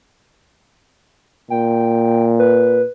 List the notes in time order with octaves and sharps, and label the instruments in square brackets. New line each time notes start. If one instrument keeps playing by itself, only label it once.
[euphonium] A#2 [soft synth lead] G5
[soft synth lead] B4